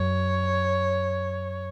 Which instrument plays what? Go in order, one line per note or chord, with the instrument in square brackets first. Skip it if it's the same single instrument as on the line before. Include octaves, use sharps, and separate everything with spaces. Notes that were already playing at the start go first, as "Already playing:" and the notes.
Already playing: [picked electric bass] F#2 [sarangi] C#5